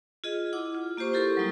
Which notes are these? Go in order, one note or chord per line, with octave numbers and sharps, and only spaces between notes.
F4 G#4 D#5
E4 F#5 D6
F4
A#3 F4 G4 C5 C#6
E4 G4 A4 A#4 C6 C#6
F#3 G3 A#3 D#4 F4